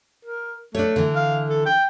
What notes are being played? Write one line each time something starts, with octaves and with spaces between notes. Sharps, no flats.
A#4
A3 D4 C#5
D3 E3
F5
A4
G5